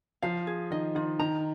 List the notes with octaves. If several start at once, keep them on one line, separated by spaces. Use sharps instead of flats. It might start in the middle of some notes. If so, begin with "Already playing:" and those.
F3 F5
G#4
D#3 D#5
D#3 F4
D#3 A#5